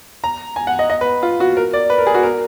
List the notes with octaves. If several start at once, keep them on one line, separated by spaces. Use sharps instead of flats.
A#5
G#5
F#5
D#5
D#5
B4
F4
F#4
A#4
D5
B4
A#4
G#4
F#4
A#4